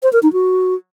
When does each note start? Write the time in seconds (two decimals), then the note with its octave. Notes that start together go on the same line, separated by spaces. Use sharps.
0.03 C5
0.13 A#4
0.23 D#4
0.33 F#4